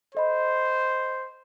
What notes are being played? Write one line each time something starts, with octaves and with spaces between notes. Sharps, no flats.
A4 C5 D#5 B5